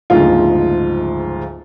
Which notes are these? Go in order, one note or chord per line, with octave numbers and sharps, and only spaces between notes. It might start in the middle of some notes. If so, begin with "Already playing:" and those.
F#1 D2 G#2 F3 F4